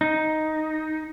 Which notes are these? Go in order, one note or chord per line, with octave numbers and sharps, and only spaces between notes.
D#4